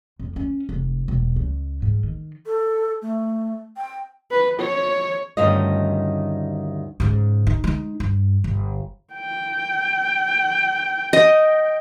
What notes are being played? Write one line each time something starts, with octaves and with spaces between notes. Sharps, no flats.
F2
C#4
F1
E1
C#2
G#2
D#3
A4
A3
G5
B4
C#5
D2 G2 D#3 C#4 F4 D#5
G#2 C#3
D#4
G#3 D#4
G2
G1
G5
D#5